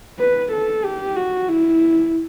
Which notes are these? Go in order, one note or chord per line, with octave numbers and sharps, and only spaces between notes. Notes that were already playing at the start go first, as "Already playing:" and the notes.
B4
A4
G4
F#4
E4